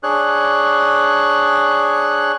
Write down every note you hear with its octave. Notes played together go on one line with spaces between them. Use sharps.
D4 G#4 C#5 F#6